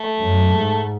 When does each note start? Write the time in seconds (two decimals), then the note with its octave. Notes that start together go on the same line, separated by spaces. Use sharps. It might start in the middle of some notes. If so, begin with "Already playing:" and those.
Already playing: A3
0.18 F#2
0.52 G#2